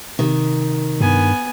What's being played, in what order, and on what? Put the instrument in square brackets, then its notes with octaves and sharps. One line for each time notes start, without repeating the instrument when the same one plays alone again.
[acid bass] C3 [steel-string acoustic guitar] D#3
[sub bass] G2 [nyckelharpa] B3 G#5